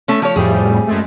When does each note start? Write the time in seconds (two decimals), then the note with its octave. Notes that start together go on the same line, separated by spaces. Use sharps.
0.08 A3 C#4
0.22 F3 C#5
0.36 F2 A2 G3 G#4
0.87 F#2 G#3 A3